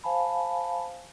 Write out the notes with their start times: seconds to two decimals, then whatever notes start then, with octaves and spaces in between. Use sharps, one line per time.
0.04 C5 F5 G#5 A5 B5